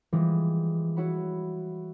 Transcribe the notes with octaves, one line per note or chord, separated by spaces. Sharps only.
E3 F3 G3 G#3 C4
E4 F#4 C#5 F#5 B5